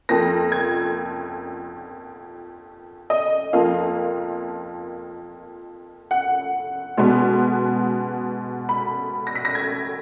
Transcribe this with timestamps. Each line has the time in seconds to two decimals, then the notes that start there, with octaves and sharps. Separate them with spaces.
0.09 F2 F3 A#3 A#6
0.52 G#6
3.10 D#5
3.53 F2 F3 A#3 F5
6.11 F#5
6.97 B2 G#3 B3
8.69 B5
9.27 A#6
9.35 B6
9.45 A#6
9.55 G#6